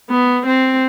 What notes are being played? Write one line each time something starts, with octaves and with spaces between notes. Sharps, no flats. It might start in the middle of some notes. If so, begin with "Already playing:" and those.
B3
C4